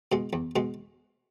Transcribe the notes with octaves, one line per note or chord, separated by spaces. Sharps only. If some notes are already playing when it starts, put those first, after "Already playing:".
B2 G#3
E2
B2 G#3